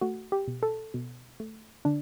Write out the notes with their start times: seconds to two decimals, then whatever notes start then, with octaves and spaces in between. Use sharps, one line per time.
0.01 A3 F#4
0.32 G4
0.48 B2
0.63 A4
0.94 B2
1.40 A3
1.85 D3 D4